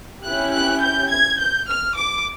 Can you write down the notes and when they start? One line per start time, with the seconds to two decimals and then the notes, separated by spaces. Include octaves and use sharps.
0.24 C#4 E4 G4 F#6
0.52 F#6
0.81 G6
1.10 G#6
1.38 G6
1.67 F6
1.96 D6